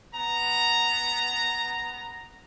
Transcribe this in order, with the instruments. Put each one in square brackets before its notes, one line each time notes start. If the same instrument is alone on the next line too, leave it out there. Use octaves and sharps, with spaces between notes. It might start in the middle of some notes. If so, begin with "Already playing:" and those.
[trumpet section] B3 A#5